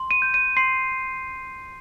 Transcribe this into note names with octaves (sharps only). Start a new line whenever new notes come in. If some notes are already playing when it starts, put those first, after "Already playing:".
Already playing: C6
D#7
G6
D#7
C6 C7